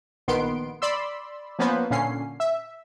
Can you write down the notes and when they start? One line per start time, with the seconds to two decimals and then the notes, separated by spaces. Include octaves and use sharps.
0.28 A#1 D#3 B3 C6 D7
0.82 D5 B5 C6 E6
1.59 F3 A#3 B3 C#4 B4 C5
1.90 A#2 D3 C#4 C7
2.40 E5